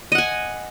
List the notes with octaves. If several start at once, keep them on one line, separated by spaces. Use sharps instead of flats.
D#5 F#5 G#5